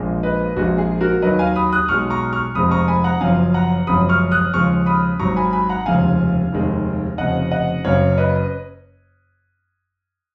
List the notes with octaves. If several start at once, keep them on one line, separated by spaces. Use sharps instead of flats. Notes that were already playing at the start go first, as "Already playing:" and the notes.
Already playing: A#1 A#2 F3 G#3
B4 D#5
A#1 A#2 F3 G#3 F#4
G#4
F#4 A#4
D#2 D#3 F#3 B4 D#5
F5 G#5
B5 D#6
D#6 F#6
B1 B2 G#3 C#6 F6
A#5 C#6
C#6 F6
F1 F2 F3 G#3 B5 D#6
A#5 C#6
G#5 B5
F#5 A#5
F#1 F#2 F3 F5 G#5
F#5 A#5
F#1 F#2 F3 G#3 B5 D#6
C#6 F6
D#6 F#6
D#2 C#3 F3 G#3 C#6 F6
B5 D#6
G#1 G#2 F#3 A#5 C#6
G#5 B5
G#5 B5
F#5 A#5
F1 D#2 C#3 F3 G#3 F5 G#5
F1 D#2 D#3 G#3
F1 F2 C#3 D#5 F#5
D#5 F#5
F#1 F#2 C#3 C#5 F5
B4 D#5